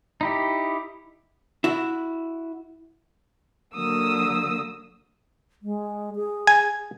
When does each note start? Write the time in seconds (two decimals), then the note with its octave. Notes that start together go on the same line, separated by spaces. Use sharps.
0.21 D#4 E4 G4
1.64 E4 F#4
3.75 D3 F#3 A#3 D#6 E6
5.62 G#3
6.15 G#4
6.47 G#5